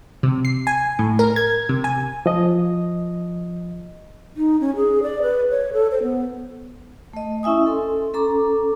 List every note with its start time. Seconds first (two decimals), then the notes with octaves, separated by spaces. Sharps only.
0.23 C3
0.45 C7
0.67 G#5
0.99 A2
1.19 A#4
1.36 G#6
1.69 C3
1.84 G#5
2.26 F3 D#5
4.37 D#4
4.60 C#4
4.76 G#4
5.03 D5
5.22 B4
5.50 C#5
5.73 A4
5.91 C5
6.03 B3
7.13 A3 D#5
7.43 C#4 E4 E5 G#5 D#6
7.66 A4 C6
8.14 C#4 A4 A#5 D6